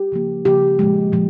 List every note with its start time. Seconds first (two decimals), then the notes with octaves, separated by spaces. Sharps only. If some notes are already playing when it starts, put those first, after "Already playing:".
Already playing: G4
0.12 C#3 F3 A#3
0.45 C#3 F3 A#3 G4
0.79 A#2 F3 G#3
1.12 A#2 F3 G#3